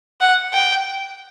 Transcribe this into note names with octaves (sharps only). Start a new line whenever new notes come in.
F#5
G5